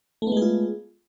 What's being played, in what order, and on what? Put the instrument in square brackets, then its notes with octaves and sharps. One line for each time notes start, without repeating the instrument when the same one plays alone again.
[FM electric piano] A3
B3
G#3
G#4
F4